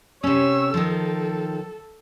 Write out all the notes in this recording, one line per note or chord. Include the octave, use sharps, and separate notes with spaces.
C3 C#4 C#5 E6
D#3 F3 A4